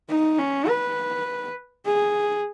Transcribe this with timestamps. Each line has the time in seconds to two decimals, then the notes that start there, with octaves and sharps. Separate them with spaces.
0.09 D#4
0.39 C#4
0.69 B4
1.86 G#4